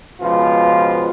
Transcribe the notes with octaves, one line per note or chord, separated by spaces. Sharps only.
C#2 B2 F3 F4 B4 C5